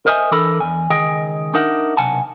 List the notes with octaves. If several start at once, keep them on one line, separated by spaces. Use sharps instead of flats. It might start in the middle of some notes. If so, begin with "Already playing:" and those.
A#4 C5 D#5 E5 G#5
E3 D4 A4 A#4 B5
E2 G#5
C#2 D#3 G#4 D#5 G5 G#5
D4 D#4 A#4 E5 F#5
B1 C3 F#5 G#5 A5